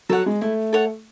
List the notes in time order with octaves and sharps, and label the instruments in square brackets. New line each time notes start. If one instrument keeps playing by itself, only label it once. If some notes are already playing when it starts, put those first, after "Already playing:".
[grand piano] F#3 [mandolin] A4 C#5 F#5
[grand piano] G#3
[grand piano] A3 [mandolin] E4
[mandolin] A4 C#5 F#5